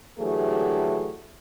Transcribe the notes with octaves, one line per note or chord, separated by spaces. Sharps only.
D3 E3 F#3 A3 G4 G#4